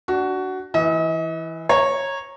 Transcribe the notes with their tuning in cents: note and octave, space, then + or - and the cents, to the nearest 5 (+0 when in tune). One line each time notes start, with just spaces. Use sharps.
D4 +0 F#4 +15
E3 +0 D#5 +40
C#5 -15 A#5 +0